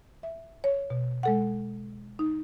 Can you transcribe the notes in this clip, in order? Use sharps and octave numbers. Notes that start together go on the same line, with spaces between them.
E5
C#5
B2
G#3 A4 F#5
D#4